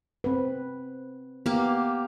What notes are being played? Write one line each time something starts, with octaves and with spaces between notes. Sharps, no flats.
C4 B4
A#3 B3 G4